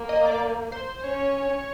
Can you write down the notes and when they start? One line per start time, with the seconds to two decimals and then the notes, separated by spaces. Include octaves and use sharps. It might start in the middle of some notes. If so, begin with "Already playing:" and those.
Already playing: A#3
0.09 D#5
0.26 D5
0.72 C5
1.04 C#4 C#5